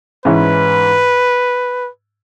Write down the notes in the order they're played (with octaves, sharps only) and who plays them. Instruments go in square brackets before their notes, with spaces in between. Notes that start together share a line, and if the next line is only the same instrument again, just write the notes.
[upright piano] G#2 E3 C#4 E4 [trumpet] B4